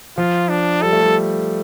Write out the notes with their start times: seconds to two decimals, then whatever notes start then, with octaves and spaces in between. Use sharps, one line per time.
0.18 F3 F4
0.49 D4
0.83 G3 A4
0.93 A3
1.02 G3